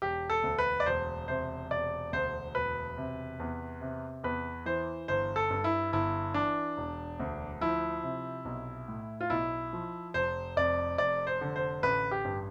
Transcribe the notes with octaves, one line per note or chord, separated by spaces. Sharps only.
E1 G4
A4
D2
B4
D5
E1 C5
C3 C5
E1 D5
D2 C5
E1 B4
C3
E2
C3
E2 B4
E3 C5
G1 C5
A4
G2
E4
G1 E4
E3 D4
E1
D2
F3 E4
C3
B1
A2
F4
B1 E4
F3
F1 C5
F2 D5
F1 D5
C5
D3
C5
A1 B4
G4
G2